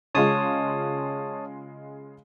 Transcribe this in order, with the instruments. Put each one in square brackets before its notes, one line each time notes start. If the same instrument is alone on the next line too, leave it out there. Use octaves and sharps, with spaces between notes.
[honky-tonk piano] C#3 G#3 F4 [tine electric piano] C#5 A5 D#6